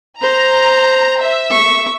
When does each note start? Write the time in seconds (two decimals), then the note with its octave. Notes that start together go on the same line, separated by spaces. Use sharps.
0.22 C5 A#5
1.21 E5
1.51 C#6